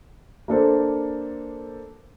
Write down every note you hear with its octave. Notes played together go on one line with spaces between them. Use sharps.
A#3 D4 A4 C5